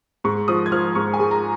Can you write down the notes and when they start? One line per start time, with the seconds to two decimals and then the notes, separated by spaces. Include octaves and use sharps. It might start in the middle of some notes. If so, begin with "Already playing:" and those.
0.24 G#2 C#6
0.48 F3 D#6
0.66 G#6
0.72 F3 F6
0.95 G#2 C#6
1.14 G#5
1.19 G#3
1.31 A#5